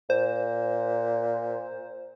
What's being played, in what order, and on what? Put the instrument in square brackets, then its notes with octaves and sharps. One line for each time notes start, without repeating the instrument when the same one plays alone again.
[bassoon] A#2 [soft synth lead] C5